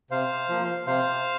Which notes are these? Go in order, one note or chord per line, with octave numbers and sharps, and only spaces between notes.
C3 C5 F5
F3 A#3
C3 C5 F5